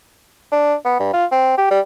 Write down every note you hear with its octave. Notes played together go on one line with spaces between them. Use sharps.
D4
B3
G2
F4
C4
G4
G3